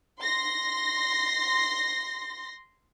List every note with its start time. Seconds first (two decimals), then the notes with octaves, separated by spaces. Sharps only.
0.19 C6 A#6